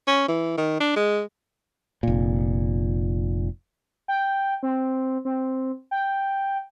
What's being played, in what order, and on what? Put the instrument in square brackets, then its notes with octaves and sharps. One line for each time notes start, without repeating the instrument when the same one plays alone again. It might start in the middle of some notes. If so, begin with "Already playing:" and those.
[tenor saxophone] C#4
E3
D#3
D4
G#3
[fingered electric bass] F1 A#2
[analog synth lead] G5
C4
C4
G5